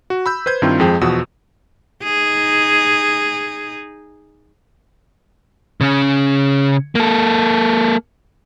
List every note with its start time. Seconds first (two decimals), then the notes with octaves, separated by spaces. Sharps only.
0.10 F#4
0.26 B5 E6 G6
0.46 B4 C5 G6 G#6
0.62 G2 D#3 C4 E4 F4
0.80 F2 F3 G#3 G#4 G5
1.01 E2 B2 F3 F#4 D#6 E6
2.03 D#4 G#4
5.81 C#3 C#4
6.95 A#3 A4